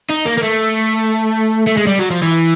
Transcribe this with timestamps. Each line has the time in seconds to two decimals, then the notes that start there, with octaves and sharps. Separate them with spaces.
0.10 D#4
0.25 A#3
0.37 A#3
0.43 A3
1.67 A3
1.77 G#3
1.87 G3
1.99 F#3
2.11 F3
2.22 E3